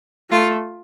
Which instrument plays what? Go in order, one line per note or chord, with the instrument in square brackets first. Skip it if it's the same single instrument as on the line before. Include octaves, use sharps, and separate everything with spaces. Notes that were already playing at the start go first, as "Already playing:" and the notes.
[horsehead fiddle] A3 [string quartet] F4